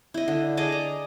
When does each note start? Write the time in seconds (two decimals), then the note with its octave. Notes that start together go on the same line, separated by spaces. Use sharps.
0.14 E4 D#5
0.28 D3
0.57 G#4 D5 D#5 A5
0.72 A#5